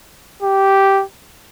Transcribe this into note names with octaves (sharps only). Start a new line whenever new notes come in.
G4